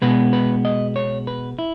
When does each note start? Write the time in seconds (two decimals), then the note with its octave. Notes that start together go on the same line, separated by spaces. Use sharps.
0.02 B2 G#3 B3 B4
0.33 B4
0.65 D#5
0.96 C#5
1.27 B4
1.59 E4